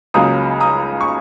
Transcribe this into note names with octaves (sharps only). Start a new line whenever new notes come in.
C#2 C#3 F#3 A#3 A#5 D#6
A#5 D#6
C#6